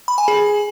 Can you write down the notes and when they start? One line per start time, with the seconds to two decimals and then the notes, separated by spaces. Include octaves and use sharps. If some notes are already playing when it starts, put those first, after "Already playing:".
0.08 B5
0.18 G#5
0.28 G#4